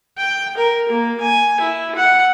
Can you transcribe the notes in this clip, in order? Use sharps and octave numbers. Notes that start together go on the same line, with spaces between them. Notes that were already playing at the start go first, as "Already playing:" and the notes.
G5
A#4
A#3
G#5
E4
F#5